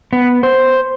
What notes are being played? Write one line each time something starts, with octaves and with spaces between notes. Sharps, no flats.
B3
C5